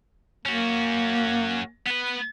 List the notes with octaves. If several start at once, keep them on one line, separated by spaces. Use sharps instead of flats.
A#3 C#4 F#4
B3 B4